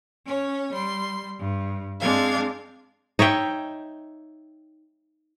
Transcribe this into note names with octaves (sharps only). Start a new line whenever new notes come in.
C#4 C#5
G3 C6
G2
G#3 C4 D4 F5 G#6
D#4 C#5 E5 G5